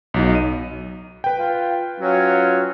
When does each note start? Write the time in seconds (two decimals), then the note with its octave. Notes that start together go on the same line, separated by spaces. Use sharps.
0.14 B1 F#3 D#4
0.35 D#7
1.24 B4 G5
1.38 F4
2.01 F#3 C#4 F4